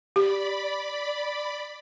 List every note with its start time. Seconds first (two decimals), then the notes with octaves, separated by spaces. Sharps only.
0.16 G4 D5 B5